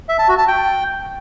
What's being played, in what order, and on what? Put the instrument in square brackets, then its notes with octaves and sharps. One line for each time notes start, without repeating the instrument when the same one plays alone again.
[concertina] E5
A5
F#4
A5
G5